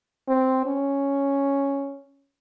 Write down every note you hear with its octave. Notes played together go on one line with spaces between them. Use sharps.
C4
C#4